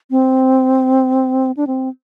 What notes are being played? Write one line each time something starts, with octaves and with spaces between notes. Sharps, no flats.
C4
D4
C4